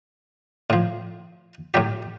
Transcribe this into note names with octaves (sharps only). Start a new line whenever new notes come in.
A2 F3
A2 F#3 G4